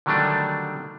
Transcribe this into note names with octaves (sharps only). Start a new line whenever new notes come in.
D3 D#3 F#3 G3 A3 D4